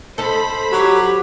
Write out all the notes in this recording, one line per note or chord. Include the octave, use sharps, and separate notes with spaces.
D#4 A4 C5 B5
F#3 G4